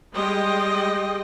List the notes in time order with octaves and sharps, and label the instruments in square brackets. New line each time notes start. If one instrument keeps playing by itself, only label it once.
[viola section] G3 G#3 D#5 G5 C6